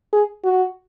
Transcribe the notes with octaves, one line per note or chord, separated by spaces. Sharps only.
G#4
F#4